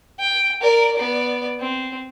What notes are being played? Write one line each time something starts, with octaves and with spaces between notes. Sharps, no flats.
G5
A#4 D5
B3 D5
C4